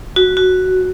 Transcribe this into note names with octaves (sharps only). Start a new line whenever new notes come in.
F#4
F#4